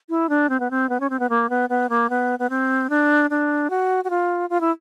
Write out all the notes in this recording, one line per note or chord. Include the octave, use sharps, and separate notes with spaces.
E4
D4
C4
B3
C4
B3
C#4
C4
B3
A#3
B3
B3
A#3
B3
B3
C4
D4
D4
F#4
F#4
F4
F4
E4